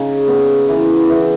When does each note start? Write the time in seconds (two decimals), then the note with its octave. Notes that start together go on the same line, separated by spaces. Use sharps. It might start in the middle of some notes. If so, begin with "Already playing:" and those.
Already playing: C#3 D#4
0.28 B3
0.68 E3
1.09 E3